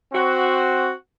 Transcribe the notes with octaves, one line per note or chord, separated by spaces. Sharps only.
C4 F#4